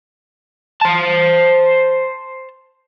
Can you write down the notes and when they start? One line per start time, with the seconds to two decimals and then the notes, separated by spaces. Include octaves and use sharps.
0.81 C5 A5